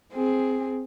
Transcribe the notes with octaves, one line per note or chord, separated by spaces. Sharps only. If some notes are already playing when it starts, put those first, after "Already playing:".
C4 G#4